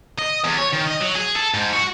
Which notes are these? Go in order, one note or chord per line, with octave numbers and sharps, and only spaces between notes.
D#5
E2
C#5
D#3
D#5
F#3
G#4
A4
G#2
F#4